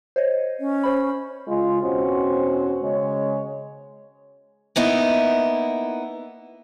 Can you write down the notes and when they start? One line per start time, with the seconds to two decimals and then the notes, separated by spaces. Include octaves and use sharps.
0.16 C5 C#5 D#5
0.60 C#4
0.83 C5 B5
1.48 C#3 G#3 F4
1.83 E2 B2 C4 C#4 F#4 C5
2.82 C#3 G#3 C#5
4.76 A#3 B3 D#4 E4